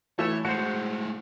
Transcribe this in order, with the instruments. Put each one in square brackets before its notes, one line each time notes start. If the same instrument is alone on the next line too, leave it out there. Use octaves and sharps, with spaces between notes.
[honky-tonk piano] E3 E7 [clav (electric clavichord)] A3 E4 [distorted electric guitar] C#5
[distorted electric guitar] A2 G#3 [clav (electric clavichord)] F#4 C5 [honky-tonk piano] C#7